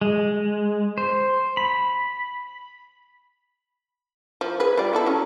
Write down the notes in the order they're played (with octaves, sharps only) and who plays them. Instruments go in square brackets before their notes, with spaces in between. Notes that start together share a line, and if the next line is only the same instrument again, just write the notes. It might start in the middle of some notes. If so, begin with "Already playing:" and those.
[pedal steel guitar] G#3
C5
B5
[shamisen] F3
G#4 B4
G3 F4 D5
B3 E4 A4
F#3 C#4